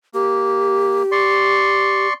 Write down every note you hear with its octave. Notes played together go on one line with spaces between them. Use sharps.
A#3 G4
D5 C6 C#6